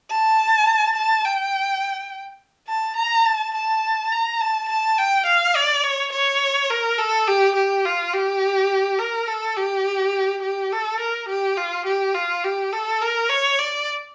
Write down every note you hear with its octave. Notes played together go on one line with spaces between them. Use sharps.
A5
A5
G5
A5
A#5
A5
A5
A#5
A5
A5
G5
F5
D5
C#5
C#5
A#4
A4
G4
G4
F4
G4
A#4
A4
G4
G4
A4
A#4
G4
F4
G4
F4
G4
A4
A#4
C#5
D5